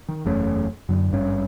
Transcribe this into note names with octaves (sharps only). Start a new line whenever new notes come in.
D#3
F#1 E2 A3 C#4
F#2 D3
G#1 G2 C#4